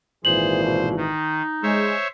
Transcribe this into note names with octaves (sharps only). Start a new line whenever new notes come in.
G#1 A#2 E3 G#4 C5 F#7
B2
D#3 D#4
G#3 C5 C#5 E5